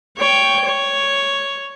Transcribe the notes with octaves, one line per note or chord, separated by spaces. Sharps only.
C#5 G5
C#5